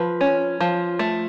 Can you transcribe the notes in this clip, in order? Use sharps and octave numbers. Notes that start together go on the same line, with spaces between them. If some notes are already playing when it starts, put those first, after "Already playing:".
Already playing: F3 B4
C#4
F3
A3